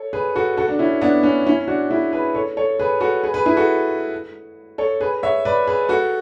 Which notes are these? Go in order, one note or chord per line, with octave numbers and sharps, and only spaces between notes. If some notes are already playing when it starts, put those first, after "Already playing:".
Already playing: A4 C#5
G#4 B4
F#4 A4
F#4 A4
D4
C#4 E4
B3 D4
C#4
C#4 E4
D4 F#4
E4 G#4
G#4 B4
A4 C#5
A4 C#5
G#4 B4
F#4 A4
G#4 B4
G#4 B4
E4 G#4
F#4 A4
A4 C#5
G#4 B4
C#5 E5
B4 D5
G#4 B4
F#4 A4